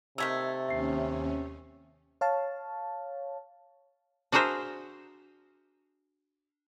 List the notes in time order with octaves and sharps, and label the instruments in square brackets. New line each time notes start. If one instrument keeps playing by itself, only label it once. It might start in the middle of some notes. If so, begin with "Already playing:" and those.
[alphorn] C3 [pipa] D#3 A3 A#3 [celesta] E6 G#6 B6
[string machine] D#2 C#4 [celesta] E5 C7
[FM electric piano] C#5 F5 A5
[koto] D4 F#4 G#4 A#4 C5 E5